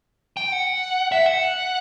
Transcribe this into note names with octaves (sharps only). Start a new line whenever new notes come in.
G5
F#5
E5
F#5